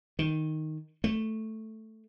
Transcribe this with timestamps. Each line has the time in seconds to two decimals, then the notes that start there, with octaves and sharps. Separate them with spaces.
0.19 D#3
1.04 A3